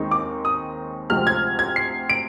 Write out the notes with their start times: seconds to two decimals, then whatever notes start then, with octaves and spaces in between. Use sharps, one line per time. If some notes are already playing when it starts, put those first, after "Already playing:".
Already playing: D#2 D#3 G#3 C4 D#4
0.11 D6
0.45 D#6
1.10 D2 C3 F3 G#3 C4 F6
1.27 G#6
1.59 G#6
1.76 C7
2.10 D7